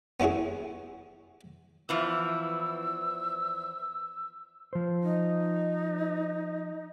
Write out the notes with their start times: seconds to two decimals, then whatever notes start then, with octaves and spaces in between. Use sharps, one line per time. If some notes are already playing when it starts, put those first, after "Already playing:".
0.20 B3 C#4 E4 F#4 G#4
1.89 E2 E3 F3 E6
4.73 F3 C5
5.03 D#4